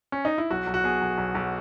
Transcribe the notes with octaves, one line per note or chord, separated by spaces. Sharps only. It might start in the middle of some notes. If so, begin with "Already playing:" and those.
C#4
D#4
E4
B1 F#4
B1
F#4
B2 G#4
B1
B1
B1